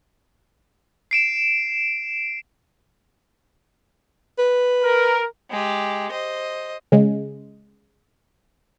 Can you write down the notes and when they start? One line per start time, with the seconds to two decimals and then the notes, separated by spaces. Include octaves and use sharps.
1.11 C7 D7 E7
4.39 B4
4.83 A#4
5.50 G#3 G4
6.12 C5 D#5
6.92 C#3 G#3